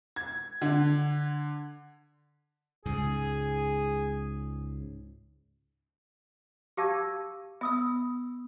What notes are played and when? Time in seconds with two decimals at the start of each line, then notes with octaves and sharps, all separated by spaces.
0.16 G#6
0.61 D3
2.86 C#2 G#2 G#4
6.77 G4 F5 A5 D6 E6 G#6
7.61 B3 E5 D#6 E6